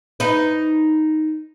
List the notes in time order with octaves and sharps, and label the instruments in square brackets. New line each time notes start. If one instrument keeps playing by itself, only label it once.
[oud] D#4 B4